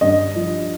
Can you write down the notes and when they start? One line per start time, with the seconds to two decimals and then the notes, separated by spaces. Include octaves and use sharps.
0.01 G2 D#5
0.36 F3